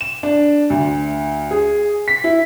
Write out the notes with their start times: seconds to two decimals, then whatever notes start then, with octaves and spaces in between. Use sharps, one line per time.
0.01 E7
0.23 D4
0.70 D2
1.51 G#4
2.08 B6
2.24 E4